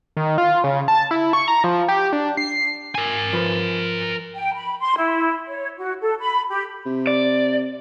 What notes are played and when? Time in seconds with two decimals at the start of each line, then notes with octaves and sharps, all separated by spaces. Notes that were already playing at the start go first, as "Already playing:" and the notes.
0.17 D#3
0.38 F4
0.64 C#3
0.88 A5
1.11 E4
1.33 C#6
1.48 A#5
1.64 F3
1.88 G4
2.13 D4
2.37 C7
2.95 A#4 G#5
3.33 F3 B4
4.35 G5
4.55 B5
4.80 C6
4.97 E4
5.47 C#5
5.78 F#4
6.02 A4
6.20 B5
6.51 G4
6.86 C3
7.07 D5